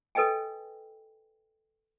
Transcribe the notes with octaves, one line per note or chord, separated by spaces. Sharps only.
A4 B4 D#5 G5 G#5